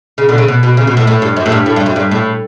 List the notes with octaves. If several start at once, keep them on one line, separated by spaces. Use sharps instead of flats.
C#3
B2 D3
C#3
B2
B2
C#3
B2
A2
A2
G2
F#2
A2
G2
A2
G2
F#2
G2
A2